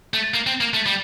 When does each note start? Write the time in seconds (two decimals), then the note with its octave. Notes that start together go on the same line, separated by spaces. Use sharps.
0.14 A3
0.34 A#3
0.47 C4
0.61 A#3
0.74 A3
0.86 G3